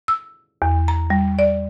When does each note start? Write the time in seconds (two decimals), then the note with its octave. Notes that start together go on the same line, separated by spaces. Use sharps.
0.08 E6
0.62 E2
0.88 A#5
1.10 G3
1.39 D5